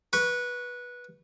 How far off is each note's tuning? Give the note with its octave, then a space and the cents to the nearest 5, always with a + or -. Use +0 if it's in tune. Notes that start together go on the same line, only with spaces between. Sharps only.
B4 -15 C#6 +0